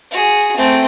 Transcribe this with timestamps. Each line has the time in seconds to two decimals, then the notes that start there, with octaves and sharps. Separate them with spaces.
0.11 F#4 G#4
0.56 A3 C4